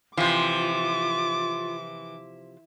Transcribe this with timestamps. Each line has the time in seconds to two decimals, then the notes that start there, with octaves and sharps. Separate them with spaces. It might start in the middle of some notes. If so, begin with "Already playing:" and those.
0.17 C3 E3 F3 F4 D6